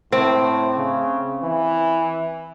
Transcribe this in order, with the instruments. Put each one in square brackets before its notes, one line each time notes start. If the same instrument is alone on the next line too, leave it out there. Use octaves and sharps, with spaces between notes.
[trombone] A2 [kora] C4
[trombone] C#3
E3